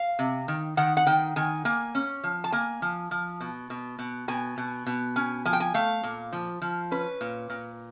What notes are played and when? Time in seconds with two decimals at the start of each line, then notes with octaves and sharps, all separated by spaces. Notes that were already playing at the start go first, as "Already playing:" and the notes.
Already playing: F5
0.19 C3
0.48 D#3
0.77 D#3 F#5
0.97 F#5
1.07 D#3 G5
1.36 D#3 G#5
1.65 A#3 G#5
1.95 C#4
2.23 F3
2.44 A5
2.52 A#3 G#5
2.82 F3
3.11 F3
3.40 B2
3.70 B2
3.99 B2
4.28 B2 G#5
4.58 B2
4.86 B2
5.16 C#4 G#5
5.45 F3 G#5
5.53 G5
5.60 G#5
5.74 A3 F5
6.03 A#2
6.32 F3
6.62 F3
6.91 C#4 B4
7.21 A#2
7.50 A#2